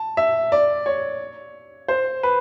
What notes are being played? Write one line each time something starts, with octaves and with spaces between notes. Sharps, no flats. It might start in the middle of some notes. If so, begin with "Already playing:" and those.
Already playing: A5
E5
D5
C#5
C5
B4